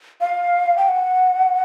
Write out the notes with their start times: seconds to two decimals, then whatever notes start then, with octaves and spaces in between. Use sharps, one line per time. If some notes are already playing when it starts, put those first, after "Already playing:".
0.21 F5
0.77 G5
0.89 F#5